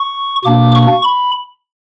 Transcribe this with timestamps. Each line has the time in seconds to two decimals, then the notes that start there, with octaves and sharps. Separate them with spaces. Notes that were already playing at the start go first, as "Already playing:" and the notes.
Already playing: C#6
0.44 B2 A#3 D4 D6
0.75 C#6
1.04 B5